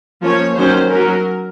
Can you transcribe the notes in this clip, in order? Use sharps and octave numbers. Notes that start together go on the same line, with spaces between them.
F3 A#3 C#4 C#5
D#3 F#3 C#4 C5
F#3 C#4 A#4